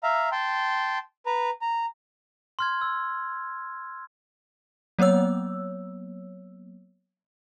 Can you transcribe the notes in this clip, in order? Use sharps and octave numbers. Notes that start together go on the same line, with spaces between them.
E5 F5 A#5
G5 A5 C6
B4 A#5
A#5
C6 F6 G#6
E6
F#3 A#3 B3 C#5 E6